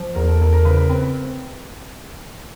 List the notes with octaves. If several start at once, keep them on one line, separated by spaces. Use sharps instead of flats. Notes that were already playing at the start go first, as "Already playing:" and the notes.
Already playing: F3
E2 A#4
A4
E2 A#4
A#4
C#3 B4
B4
C4 B4